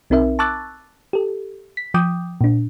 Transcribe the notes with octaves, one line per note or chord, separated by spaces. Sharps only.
B1 C4 D#4 A#4 E5
A5 C#6 D6 E6 F#6 A6
G4 A4
B6
F3 G5 D6 D#6 G6
A#2 D4